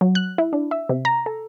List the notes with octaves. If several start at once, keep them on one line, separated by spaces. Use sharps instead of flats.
F#3
F#6
E4
D4
E5
C3
A#5
A4